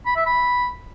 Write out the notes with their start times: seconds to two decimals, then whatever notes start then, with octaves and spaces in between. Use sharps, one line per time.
0.06 B5
0.16 E5
0.26 B5